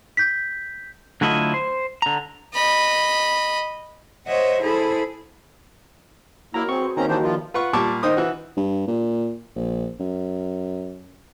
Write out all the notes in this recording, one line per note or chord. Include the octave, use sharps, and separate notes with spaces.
G6 B6
D3 F#3 A3 E4 F4 D#5
C5
D3 A#5
D#5 B5
C5 C#5 D#5 E5 F#5
E4 G#4 A4 C5 B5
F#3 A#3 E4 A#4 D#5 A#5
C4 F#4 G#4 C#6
B4 C5
D#3 A#3 C4 C#4 A#5
E3 F#3 G3 D4 D#4 C5
F3 E4 F4 A#4 D5
F4 B4 F#5 C#6
A#2 G3 A5 C#6 D6
D#3 D#4 C5 D#6
E3 F#4
G2
A#2
A#1
F#2